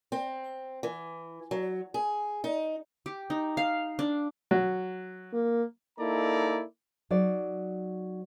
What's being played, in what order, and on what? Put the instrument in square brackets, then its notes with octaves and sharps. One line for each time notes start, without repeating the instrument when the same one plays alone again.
[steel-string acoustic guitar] C4
E3
F#3
G#4
D#4
[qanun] G4
D#4
F5
D4
[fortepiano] F#3
[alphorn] A#3
[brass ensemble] A#3 D#4 E4 A4 D5 A#5
[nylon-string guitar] F#3 D#4 D5